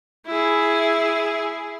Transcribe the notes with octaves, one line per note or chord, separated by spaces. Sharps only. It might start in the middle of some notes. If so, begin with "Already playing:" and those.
E4 G#4